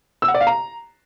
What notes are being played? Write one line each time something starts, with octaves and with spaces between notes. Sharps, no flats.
E6
F#5
D5
F5
A#5